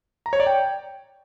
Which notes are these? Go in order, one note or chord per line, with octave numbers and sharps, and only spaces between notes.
A#5
C#5
D5
G5